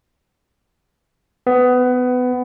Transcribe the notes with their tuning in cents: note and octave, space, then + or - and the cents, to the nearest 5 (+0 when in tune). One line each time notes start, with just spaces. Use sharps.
B3 +20